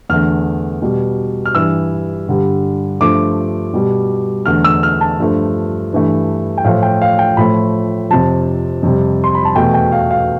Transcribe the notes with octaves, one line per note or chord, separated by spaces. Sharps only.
E2 D3 A3 F6
B2 G3
F6
G2 E3 G3 E6
G2 D3 G3
G2 F3 A3 D6
B2 G3
E2 D3 A3 F6
E6
F6
A5
G2 F3 A3
G2 E3 A3
G5
A2 F3 A3 F5
G5
F5
G5
A2 F3 A3 B5
F2 C3 F3 A5
F2 C3 G3
C6
B5
A5
E2 B2 A3 G5
G5
F5
F5